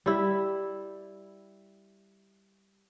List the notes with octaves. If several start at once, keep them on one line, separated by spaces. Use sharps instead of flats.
G3 E4